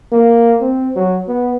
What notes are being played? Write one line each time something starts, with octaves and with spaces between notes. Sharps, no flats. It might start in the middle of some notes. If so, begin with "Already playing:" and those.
A#3
C4
F#3
B3